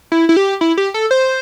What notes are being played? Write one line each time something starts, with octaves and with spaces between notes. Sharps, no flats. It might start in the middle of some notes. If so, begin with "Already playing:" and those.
E4
E4
G4
E4
G4
A4
C5